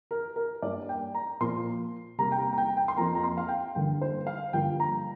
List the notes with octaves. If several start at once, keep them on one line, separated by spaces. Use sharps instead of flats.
A#4
A#4
G2 G3 A#3 D5
G5
A#5
A#2 F3 A#3 C6
C3 G3 A#3 A#5
G5
A#5
A#5
G5
G5
C6
F2 F3 A#3 A#5
A#5
C6
F5
G5
G2 D3 A#3 G5
C5
F5
G2 D3 F3 A#3 G5
A#5